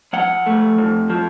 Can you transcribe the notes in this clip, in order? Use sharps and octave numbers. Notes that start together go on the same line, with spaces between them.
F3 F#5
A3
F2
F3